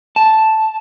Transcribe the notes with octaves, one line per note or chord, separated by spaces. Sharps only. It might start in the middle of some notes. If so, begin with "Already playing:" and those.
A5